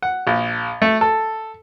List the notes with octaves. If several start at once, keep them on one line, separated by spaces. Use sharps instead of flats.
F#5
A#1
A3
A4